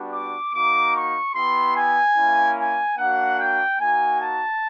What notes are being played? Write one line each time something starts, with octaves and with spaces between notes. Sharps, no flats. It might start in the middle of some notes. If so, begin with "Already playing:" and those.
Already playing: G3 B3 D4 F#4
D6
A#3 D#4 F#4 D6
C#6
B3 E4 G4 C6
G#5
A#3 C#4 E4
G#5
A#3 D4 F#4 F#5
G5
A#3 D#4 F#4 G#5
A5